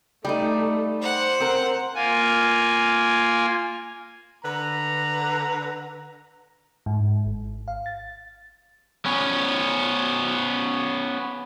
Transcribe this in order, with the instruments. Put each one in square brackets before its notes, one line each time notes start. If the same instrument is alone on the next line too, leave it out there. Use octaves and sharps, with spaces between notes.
[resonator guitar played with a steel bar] G3 D#4 [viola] A3
[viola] C5 [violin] F#5
[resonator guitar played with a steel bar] C4 A#4
[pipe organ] A#3 F4 G#5
[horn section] D3 B4 A#5
[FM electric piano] G#2
G#1
F5
A6
[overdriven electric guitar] B3 C#4